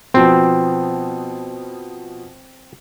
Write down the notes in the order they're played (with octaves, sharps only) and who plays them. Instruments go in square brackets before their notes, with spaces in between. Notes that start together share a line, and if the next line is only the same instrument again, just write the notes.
[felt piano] B2 F3 B3 [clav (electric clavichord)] C4